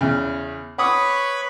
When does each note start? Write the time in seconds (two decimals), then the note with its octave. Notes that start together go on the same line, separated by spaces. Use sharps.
0.01 E2 C#3
0.78 B4 C#5 F#5 B5 D6 D#6